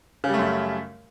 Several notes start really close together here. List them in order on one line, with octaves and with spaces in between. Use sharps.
C#3 G3 A3 F#2